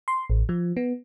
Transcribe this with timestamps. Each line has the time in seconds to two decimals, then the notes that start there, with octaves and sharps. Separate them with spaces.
0.08 C6
0.30 A1
0.49 F3
0.77 B3